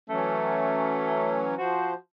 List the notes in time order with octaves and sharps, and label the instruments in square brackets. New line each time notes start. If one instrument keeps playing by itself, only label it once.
[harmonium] E3 F#3 C#4 [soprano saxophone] A3
[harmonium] F3 C5 [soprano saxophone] F#4